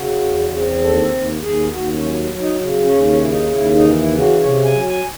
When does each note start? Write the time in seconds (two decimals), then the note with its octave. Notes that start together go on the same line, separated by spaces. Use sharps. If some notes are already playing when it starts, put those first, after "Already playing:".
Already playing: C#3 F#4
0.22 E2
0.52 C4
0.82 D#2 A4
1.12 D#2
1.42 D#2 G#4
1.72 D#2 F#4
1.94 C#4
2.02 F#3
2.32 F#3
2.40 D#4
2.62 C#3
2.84 C#4
2.92 D#2
3.08 C#4
3.20 C#3 E4
3.30 D#4
3.52 D#2 E4
3.75 D#4
3.82 E3
3.97 E4
4.12 C#3
4.19 F#4
4.41 C3 C#5
4.65 G#5
4.72 F#3
4.87 G#5